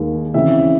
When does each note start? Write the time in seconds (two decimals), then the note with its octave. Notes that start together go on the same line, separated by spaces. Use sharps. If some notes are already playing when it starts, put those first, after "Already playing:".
Already playing: D#2 D#3 G#3
0.34 C#3 E3 G#3 C4 E5